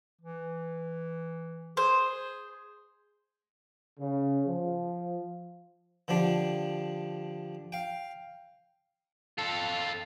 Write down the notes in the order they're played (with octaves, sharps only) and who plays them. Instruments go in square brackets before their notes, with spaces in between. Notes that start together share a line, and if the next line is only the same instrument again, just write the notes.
[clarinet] E3
[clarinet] G#4 [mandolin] C5
[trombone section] C#3
F3
[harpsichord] D3 F3 G3 D4
F5 G5
[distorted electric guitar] F4 A4